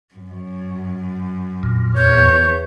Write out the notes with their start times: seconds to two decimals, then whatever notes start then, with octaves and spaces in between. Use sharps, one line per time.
0.14 F#2
1.63 F2 A#2
1.97 E2 C#5 G6